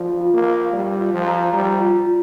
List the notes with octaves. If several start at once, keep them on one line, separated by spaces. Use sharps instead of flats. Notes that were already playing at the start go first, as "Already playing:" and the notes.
Already playing: F3 F4 D5
F4
A#3
F5
G3 D5
F4
F3
A#5
G3 A#5
F4
F4